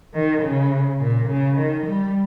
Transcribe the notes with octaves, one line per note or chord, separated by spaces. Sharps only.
D#3
C#3
A#2
C#3
D#3
G3